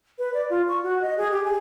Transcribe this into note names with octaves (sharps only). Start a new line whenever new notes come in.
B4
D5
F4
C#6
F#4
D#5
G#4
G4
G#5